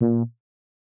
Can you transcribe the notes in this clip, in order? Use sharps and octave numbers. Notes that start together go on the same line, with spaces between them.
A#2